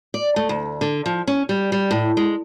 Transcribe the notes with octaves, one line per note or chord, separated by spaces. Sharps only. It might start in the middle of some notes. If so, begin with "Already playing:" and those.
D5
A3
D2
D3
F3
C#4
G3
G3
A2
G#3